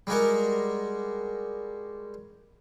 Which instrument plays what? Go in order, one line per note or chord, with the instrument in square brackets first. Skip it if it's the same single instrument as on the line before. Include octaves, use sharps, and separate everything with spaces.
[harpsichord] G3 G#3 F#4 A#4